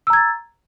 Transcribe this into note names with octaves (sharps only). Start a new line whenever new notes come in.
A#5 E6 G#6 A6